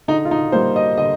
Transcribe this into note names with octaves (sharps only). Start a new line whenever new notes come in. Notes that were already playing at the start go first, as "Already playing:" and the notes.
D3 D#4
F4
D#4
G3 A#3 C5
D#5
D3 D#5